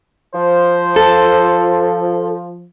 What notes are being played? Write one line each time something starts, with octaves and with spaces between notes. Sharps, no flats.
F3 C5
A4